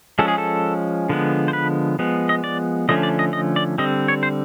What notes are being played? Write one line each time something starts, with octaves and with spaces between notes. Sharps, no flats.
F3 G#3 C#4 A4
G#4
A4
D3 F3 G#3 B3
C5
B4
F3 G#3 B3
D#5
D5
D3 F3 A3 C#4 D#5
D5
D#5
D#5
D5
D3 G3 C4 D#5
C#5
C5